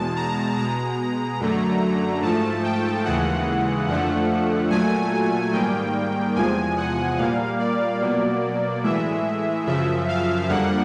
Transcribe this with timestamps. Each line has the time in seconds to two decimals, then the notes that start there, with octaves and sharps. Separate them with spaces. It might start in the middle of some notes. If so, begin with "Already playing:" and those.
Already playing: E2 B2 G#3 A5
0.16 A#5
0.57 B2 G#3 A#5
1.40 F#2 D3 F#3 A3
2.22 G#2 F3 A3 A5
2.64 G5
3.05 D#2 C#3 E3 G#3 F#5
3.87 F2 D3 F3 A3 F#5
4.70 A#2 F#3 A3 G#5
5.53 G#2 D#3 G3 A#3 G5
6.36 E2 C3 F3 G#3 G#5
6.77 F#5
7.19 A#2 G3 A#3 F5
7.60 D5
8.01 B2 F#3 A#3
8.84 A2 E3 G#3 E5
9.67 F#2 C#3 F3 E5
10.08 F5
10.49 F2 D3 G3 A#3 F#5